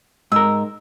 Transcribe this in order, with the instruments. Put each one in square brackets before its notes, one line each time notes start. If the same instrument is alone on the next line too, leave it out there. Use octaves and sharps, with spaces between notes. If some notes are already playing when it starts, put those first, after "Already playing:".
[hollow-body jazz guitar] G#2 A#4 [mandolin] E6